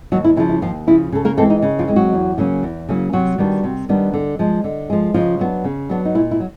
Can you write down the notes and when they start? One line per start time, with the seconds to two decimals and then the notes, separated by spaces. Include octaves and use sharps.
0.12 D#2 F#3 F#4
0.24 E4
0.37 C#3 F3 E4
0.49 E4
0.62 D#2 F3 F4
0.87 C#3 F3 E4
1.12 C#3 A4
1.25 A#3 A#4
1.37 E3 G#3 A3 C4 A4
1.50 D#4
1.62 C#3
1.79 F3 F4
1.87 E3 G#3 C4
1.96 F#3 F#4
2.13 E2
2.38 C#3 F#3 A#3 C#4
2.63 E2
2.89 C#3 F#3 A#3 C#4
3.13 C3 F#3 F#4
3.38 D#3 G3 B3 D4
3.64 C3
3.89 D#3 G3 B3 D4
4.14 D3
4.39 F3 G#3
4.64 D3
4.90 F3 G#3
5.14 C#3 F3 F4
5.39 F#3 B3 D4
5.64 C#3
5.89 F#3 B3 D4
6.05 D#4
6.15 A#2 E4
6.31 E4
6.40 F#3